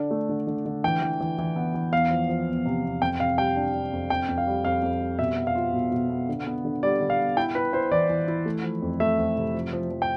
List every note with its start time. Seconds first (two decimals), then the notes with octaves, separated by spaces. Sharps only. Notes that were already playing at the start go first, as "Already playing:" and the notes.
Already playing: D3 D4
0.11 A3
0.29 D3
0.47 D3
0.65 D3
0.84 E3 G5
1.02 E3
1.20 E3
1.38 E3
1.56 B3
1.74 E3
1.92 E2 F5
2.11 F3
2.29 F3
2.47 E2
2.65 C3
2.84 E2
3.02 F2 G5
3.20 C3 F5
3.38 G3 G5
3.56 D4
3.74 D4
3.92 F2
4.10 F2 G5
4.29 F2
4.38 F5
4.47 G3
4.65 F2 F5
4.82 F2
5.01 G3
5.19 B2 E5
5.37 B3
5.47 F5
5.55 F4
5.74 B2
5.91 B2
6.10 B3
6.29 D3
6.47 B3
6.65 D3
6.83 G3 D5
7.01 D3
7.10 F5
7.19 B3
7.37 E4 G5
7.55 E4 B4
7.73 E4 C5
7.92 E3 D5
8.10 E3
8.28 E4
8.46 A3
8.64 F3
8.82 F2
9.00 A3 E5
9.18 F2
9.36 C3
9.54 F3
9.73 F3
9.91 F3
10.02 G5